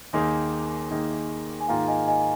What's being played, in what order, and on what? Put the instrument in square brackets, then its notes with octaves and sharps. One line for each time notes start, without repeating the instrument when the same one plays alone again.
[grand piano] D#2 D#3 A#3 D#4 G#4 [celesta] G#5 C6
[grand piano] D#2 D#3 A#3 D#4 G#4
[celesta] G#5
[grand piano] G#2 D#3 A#3 F4 G#4 [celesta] F5 A#5
[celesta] D#5 G#5
D#5 G#5